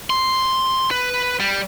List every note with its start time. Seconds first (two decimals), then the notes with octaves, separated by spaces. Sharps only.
0.10 C6
0.91 B4
1.40 G3